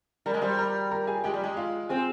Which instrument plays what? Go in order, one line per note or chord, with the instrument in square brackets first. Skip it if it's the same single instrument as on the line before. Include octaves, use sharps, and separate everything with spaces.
[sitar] G3 [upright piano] A#4 A#5
[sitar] G#3
[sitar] G3 [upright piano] C5 C6
[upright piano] A#4 A#5
A#4 A#5
G#4 G#5
[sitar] G#3 [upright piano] G4 G5
[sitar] G3
G#3
[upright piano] F4 F5
[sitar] C4 [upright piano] G#4 G#5